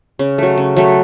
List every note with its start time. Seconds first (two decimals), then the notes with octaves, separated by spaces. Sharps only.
0.19 C#3
0.38 F#3 A3
0.58 C#3
0.77 F#3 A3